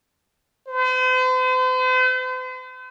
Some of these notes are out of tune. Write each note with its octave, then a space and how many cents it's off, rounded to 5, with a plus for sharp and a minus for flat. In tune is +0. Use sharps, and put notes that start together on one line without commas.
C5 -45